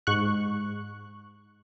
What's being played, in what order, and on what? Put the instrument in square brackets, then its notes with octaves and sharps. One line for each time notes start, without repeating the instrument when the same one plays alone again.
[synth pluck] G#2 C#6 F#6